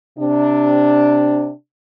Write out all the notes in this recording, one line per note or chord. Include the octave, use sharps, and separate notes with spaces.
C3 D4